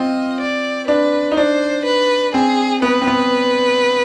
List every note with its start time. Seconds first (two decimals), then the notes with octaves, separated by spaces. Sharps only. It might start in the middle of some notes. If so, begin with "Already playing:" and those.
Already playing: C4 F4 D#5
0.40 D5
0.88 D4 B4
1.32 D#4
1.36 D4 C5
1.85 B4
2.34 C4 G#4
2.82 B3 B4
3.02 C4
3.07 B3